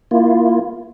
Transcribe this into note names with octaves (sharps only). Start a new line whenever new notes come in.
A#3 E4 F4